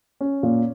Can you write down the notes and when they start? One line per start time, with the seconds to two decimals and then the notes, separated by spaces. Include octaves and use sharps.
0.21 C#4
0.43 A#2